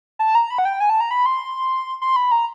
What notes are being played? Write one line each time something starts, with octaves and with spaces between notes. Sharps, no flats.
A5
A#5
B5
F#5
G5
G#5
A5
A#5
B5
C6
C6
B5
A#5